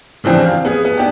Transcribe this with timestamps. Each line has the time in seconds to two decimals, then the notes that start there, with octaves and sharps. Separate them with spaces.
0.24 C#3 E3 F3 C4 D4
0.46 F5
0.65 B3 G#4
0.85 B3
0.98 B3 D4 G4